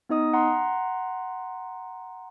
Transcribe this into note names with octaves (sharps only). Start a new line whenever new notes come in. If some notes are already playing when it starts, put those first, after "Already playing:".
B3 D#4 D#5 D#6
F#5 A#5 C6